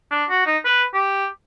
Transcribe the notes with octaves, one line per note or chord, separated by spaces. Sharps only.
D4
F#4
D#4
B4
G4